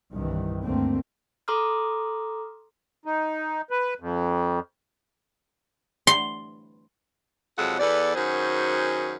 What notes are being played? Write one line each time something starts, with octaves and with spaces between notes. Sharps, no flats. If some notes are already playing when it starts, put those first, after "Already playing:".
C2 G2 D#3 E3
D2 G2 D3 A3 A#3 C4
A4 A#5 C6 D6 D#6 F6
D#4
B4
F2
C6
F2 C3 F#3 G#3 A4 F#5
E2 B3 A4 D5
F#2 D#3 F#4 G#4 C5